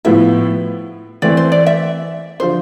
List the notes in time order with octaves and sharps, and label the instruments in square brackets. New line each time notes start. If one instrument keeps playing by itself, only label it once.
[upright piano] A2 F3 B3 E4 [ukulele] E5
[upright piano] E3 A3 C4 [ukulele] D5
[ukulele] C5
D5
E5
[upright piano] D3 F3 [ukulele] C5